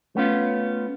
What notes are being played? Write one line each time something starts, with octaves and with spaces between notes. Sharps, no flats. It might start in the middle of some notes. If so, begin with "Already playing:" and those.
A3 B3 C#4 F4